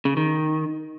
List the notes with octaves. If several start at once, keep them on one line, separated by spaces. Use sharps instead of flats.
C#3
D#3